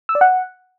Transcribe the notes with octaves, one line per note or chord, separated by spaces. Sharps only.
E6
D5
F#5